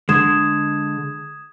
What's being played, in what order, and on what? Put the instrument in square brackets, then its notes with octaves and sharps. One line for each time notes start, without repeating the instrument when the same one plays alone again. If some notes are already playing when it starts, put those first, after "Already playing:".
[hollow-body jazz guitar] D3 G#3 [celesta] D#6 G#6 E7